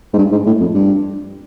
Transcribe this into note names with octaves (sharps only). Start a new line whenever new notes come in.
G#2
G2
G#2
A2
F2
G2